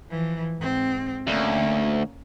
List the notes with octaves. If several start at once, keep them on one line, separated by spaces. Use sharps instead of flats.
E3 F3
G#2 C4
D2 A#3 C#4